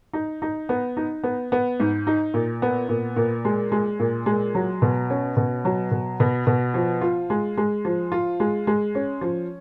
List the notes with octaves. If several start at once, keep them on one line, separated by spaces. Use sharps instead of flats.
D#4
D#4
B3
D#4
B3
B3
G#2
D#4
A#2
B3
A#2
A#2
G#3
G#3
A#2
G#3
F#3
B2
C#4
B2
F#3
B2
B2
B2
F3
F4
G#3
G#3
F3
F4
G#3
G#3
C#4
F3